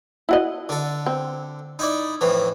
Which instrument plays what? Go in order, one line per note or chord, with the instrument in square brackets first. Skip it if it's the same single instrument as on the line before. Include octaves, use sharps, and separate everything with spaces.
[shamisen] E4 F#4 D#5
[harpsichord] D3 A4
[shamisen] C4
[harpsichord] D#4 E4 D5
F2 A2 E3